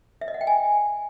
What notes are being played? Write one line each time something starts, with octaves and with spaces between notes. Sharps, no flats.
E5
D#5
F#5
G5
G#5